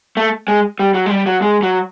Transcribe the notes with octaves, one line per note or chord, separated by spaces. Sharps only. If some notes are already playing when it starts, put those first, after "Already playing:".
A3
G#3
G3
F#3
G#3
G3
F#3
G#3
F#3